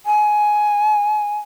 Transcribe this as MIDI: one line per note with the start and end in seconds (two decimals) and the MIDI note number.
0.06 1.38 80